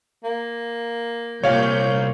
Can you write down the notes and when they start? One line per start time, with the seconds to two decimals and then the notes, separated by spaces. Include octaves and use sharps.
0.23 A#3
1.43 C2 A#2 C#5 F5 G6